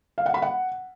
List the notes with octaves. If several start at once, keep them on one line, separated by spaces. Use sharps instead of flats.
F5
F#5
B5
F#5